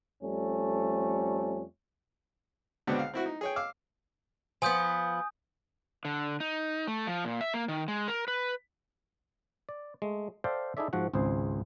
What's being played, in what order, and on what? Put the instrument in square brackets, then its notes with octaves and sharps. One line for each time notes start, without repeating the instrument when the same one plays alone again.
[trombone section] F2 G3 A3 C#4
[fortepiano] C#2 B2 D3 B3 C4 D4
F5
C4 E4 F#4
D#4
G#4 C#5 G5
F5 D6 E6 F6
[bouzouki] F3 B3 [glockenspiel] G#5 D#6 G6
[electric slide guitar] D3
D#4
A3
F3
A#2
E5
A#3
D#3
G#3
A#4
B4
[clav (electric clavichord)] D5
G#3 A3
A4 C5 D5 E5 F5 G5
D#4 E4 G#4 A4 D5 E5
G#2 F3 F#4 F#5
G#1 C#2 C4 G#4 C5